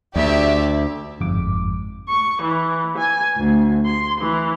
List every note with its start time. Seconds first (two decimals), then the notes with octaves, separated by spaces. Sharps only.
0.16 D2 G4 D5 E5
1.20 G1 F2 G#2 D6
2.08 C#6
2.42 E3
2.97 G#5
3.38 D2
3.85 C6
4.20 E3